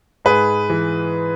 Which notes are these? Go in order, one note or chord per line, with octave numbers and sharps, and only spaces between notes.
G#2 G#4 B4
E3